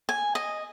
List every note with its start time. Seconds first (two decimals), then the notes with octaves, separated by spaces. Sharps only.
0.09 G#5
0.35 D#5